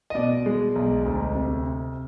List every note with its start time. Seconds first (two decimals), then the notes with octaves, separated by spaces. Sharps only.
0.10 D#5
0.15 B2 D5
0.46 G#3
0.76 B1
1.05 D2
1.35 C3